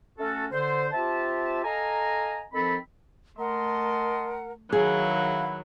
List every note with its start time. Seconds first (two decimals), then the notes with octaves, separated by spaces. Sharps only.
0.19 A3 C#4 F#4 A4
0.52 D3 C5
0.92 C4 F4 G4 E5 A5
1.64 A4 D#5 F5 G#5 A#5
2.53 D#3 F3 C4 A4 B5
3.38 A3 A#4 D#5 F#5 A5 A#5 C6
4.72 D#3 F#3 E4 F#4 G#4 B4 F5